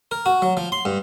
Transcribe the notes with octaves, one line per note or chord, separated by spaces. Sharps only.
A#4
F#4
F#3
F3
C6
G2